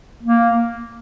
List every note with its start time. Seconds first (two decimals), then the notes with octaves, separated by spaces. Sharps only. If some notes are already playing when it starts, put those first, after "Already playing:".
0.23 A#3